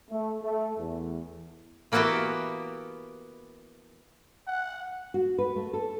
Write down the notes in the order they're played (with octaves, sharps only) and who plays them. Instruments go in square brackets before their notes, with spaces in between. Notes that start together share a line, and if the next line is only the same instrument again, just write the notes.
[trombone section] A3
A3
E2
[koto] E3 A#3 B3 E4 F#4 G4
[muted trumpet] F#5
[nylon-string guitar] F#4
B4
A3
A4